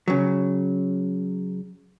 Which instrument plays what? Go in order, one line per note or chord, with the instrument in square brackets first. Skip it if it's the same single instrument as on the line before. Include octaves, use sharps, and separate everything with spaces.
[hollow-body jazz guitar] C#3 F#3